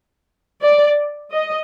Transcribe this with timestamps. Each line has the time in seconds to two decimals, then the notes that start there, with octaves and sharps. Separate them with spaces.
0.62 D5
1.33 D#5